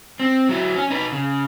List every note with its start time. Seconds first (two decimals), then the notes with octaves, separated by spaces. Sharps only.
0.20 C4
0.49 F#3 E4
0.76 C#4
0.90 D#4 B4
1.12 C#3